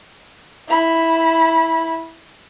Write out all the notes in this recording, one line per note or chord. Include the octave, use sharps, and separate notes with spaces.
E4 B5